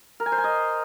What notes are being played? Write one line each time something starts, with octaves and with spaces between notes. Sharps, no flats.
A#4
G#5
C5
G#5
D#5